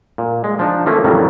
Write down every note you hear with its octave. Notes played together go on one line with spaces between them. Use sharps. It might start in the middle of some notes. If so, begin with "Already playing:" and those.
A#2
G#3
F3 D4 D#4
D#3 F3 A3 A#3 C#4
F2 A2 D#3 E3 F#3 G3